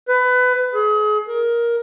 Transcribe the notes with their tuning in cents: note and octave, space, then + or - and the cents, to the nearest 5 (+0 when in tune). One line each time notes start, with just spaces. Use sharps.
B4 +25
G#4 +35
A#4 +10